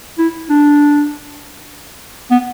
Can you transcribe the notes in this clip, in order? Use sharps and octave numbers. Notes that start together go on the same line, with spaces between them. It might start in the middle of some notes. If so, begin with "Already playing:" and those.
E4
D4
B3